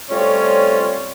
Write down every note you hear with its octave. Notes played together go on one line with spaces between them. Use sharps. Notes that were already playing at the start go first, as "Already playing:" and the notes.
G3 A3 C4 C#4 F4 C#5